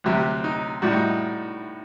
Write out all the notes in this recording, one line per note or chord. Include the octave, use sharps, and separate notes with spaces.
D2 C3 F#3 G4
D#4
A2 G3 F#4
D#4